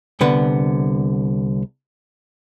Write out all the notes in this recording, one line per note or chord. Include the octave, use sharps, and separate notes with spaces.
C2 D3 B3